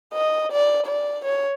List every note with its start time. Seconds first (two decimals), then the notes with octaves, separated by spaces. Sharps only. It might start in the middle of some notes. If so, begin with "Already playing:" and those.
0.13 D#5
0.52 D5
0.86 D5
1.25 C#5